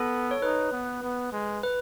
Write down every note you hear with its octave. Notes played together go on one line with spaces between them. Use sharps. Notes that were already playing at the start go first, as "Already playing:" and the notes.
Already playing: B3 A4
C#5
D#4 B4
B3
B3
G#3
B4